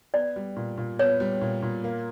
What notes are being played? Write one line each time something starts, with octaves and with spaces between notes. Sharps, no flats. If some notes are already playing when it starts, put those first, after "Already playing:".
B3 D5
G3
A#2
A#2
B3 C#5
G3
A#2
A#2
A#3